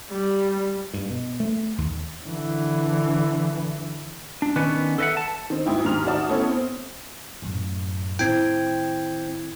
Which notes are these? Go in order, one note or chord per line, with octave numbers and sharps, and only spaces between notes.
G3
G2
B2
A3
D#2
D3 E3
D4
D#3 B3 C#4 D4 B4
A4 B4 D#5 E5 F#5
A5
D#3 C4
D2 G#2 E4 G5 D#6
D#2 G#2 A#5 F6 F7
A1 D#3 F#4 D5 A5 D#6
A3 B3 C#4 E4 A4 C#5
C4
F#2 A2
A2 D#3 C4 E4 G5 G#6